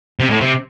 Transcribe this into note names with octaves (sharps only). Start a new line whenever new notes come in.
C3
A2
C3